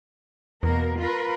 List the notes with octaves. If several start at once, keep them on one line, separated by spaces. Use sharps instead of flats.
E2 B2 A#3 A#4
F4 A#4 B4